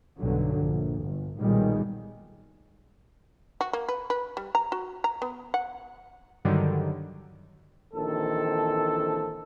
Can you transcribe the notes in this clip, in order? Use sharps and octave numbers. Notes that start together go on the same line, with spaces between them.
B1 G2 D3 F#3
A#1
G1
B1 A#2 D#3 G3 G#3
F#4
A#3
B4
B4
G3
A#5
F#4
A#5
B3
F#5
G2 D3 D#3 F#3 G3
A#1 D#3 E3 C4 A4